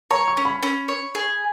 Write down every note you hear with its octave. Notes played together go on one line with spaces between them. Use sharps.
C#5 A#5
C#6
C#4
B5
C#4
C#5
G#4